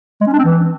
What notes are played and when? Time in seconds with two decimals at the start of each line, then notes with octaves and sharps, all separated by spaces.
0.21 G#3
0.27 C#4
0.33 D4
0.39 C4
0.45 E3